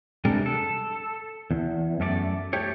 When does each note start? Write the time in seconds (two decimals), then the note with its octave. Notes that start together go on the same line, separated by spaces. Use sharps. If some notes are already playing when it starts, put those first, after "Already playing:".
0.25 C3 G3 G#3 D4 A4 A#4
0.46 A4
1.51 E2
2.00 F#2 A3 F#4 D5
2.53 A3 G4 C#5